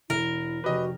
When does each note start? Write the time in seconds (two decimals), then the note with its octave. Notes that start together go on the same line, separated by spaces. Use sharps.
0.10 E1 E4 A#4
0.64 F1 F#4 G4 B4 D#5 D6